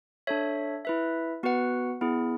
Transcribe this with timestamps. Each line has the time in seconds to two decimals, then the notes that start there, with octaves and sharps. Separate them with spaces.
0.27 D4 A4 C#5 E5
0.85 E4 B4 E5
1.43 B3 F#4 B4 F#5
2.01 B3 E4 G#4